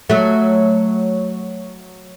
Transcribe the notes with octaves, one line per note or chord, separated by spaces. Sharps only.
F#3 A3